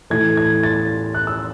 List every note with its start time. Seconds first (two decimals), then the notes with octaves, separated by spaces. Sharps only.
0.10 A2 E3 A3 G#6
0.37 G#6
0.63 A6
1.14 F#6
1.27 E6